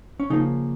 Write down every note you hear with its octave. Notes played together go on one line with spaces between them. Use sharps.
C#4
C#3 F3 A#3 D#4